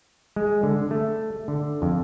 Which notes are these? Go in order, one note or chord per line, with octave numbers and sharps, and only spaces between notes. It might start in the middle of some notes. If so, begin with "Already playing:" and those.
G#3
D3
A3
D3
F2